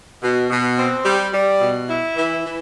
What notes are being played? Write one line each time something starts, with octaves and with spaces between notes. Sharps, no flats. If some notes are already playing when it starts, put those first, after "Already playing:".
B2
B2
C4
G3
G3
B2
E4
E3
E3